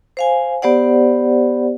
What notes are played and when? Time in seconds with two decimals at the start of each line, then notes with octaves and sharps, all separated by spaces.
0.17 C5 F5 G#5
0.62 B3 G4 C5 D5 F#5